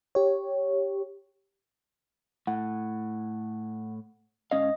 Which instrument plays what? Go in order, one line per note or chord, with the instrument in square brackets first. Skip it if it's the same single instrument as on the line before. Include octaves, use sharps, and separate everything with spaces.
[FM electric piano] G4 C#5
[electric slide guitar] A2 [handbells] F#5
[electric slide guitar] G#2 C#4 F5 [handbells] D#5